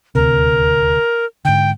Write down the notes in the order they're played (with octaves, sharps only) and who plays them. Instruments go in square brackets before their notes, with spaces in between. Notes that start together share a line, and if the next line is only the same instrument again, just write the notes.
[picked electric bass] D#1 D2 C3 [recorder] A#4
[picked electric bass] G#2 D3 [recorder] G5